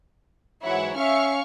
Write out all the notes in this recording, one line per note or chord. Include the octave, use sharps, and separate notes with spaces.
G#2 E3 F#3 E4 C#5 F#5
C#4 E5 F5 C#6 F6